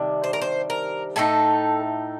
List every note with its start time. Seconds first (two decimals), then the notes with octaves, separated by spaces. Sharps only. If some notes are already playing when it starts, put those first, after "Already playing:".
Already playing: C3 D#3 G3 D4
0.24 C5
0.33 A#4
0.41 C5
0.70 A#4
1.16 A2 A3 D#4 A4